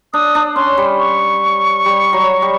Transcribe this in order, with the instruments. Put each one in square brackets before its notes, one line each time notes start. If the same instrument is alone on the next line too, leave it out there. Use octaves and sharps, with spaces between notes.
[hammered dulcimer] D4 [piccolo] D#6
[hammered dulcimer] D4
[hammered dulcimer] C#4 [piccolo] C6
[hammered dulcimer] G3
[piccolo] C#6
[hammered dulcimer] G3
F#3
G3